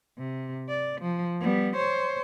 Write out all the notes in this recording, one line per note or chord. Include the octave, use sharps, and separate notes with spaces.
C3
D5
F3
G3 B3
C5 C#5